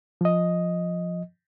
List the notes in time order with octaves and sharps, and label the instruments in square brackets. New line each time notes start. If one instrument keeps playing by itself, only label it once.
[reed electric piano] F3 D#5